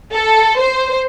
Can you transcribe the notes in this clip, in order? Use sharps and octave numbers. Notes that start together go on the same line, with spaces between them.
A4
C5